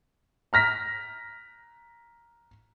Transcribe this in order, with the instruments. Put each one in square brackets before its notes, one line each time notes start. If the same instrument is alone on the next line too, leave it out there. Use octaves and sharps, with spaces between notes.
[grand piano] A#5 F6 A#6 B6